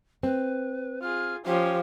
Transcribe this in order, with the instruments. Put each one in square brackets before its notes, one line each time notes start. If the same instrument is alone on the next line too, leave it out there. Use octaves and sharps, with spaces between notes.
[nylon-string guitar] C4 [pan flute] B4
[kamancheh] F4 G#4 [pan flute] F6
[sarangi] F3 [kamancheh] C#4 G5 [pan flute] G4